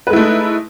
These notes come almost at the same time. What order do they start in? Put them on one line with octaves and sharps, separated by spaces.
B4 G#3 E4 A3 D#4